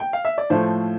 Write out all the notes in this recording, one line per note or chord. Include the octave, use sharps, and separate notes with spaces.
G5
F5
E5
D5
A2 F3 A3 C5